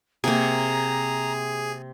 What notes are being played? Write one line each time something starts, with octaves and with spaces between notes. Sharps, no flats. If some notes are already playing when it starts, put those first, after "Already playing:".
C3 A#3 G#4 A#5